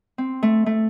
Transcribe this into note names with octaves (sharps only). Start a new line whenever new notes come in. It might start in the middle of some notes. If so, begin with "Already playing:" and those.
C4
A3
A3